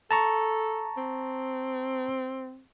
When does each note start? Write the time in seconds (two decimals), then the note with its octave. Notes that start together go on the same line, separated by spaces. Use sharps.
0.11 A4 A5 A#5 C#6
0.97 C4